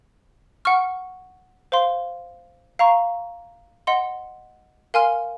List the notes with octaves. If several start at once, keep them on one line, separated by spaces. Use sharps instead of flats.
F#5 C#6 F6
C5 F5 C6
F5 A#5 C#6
D#5 F#5 C6
A#4 F5 G#5 C6 F6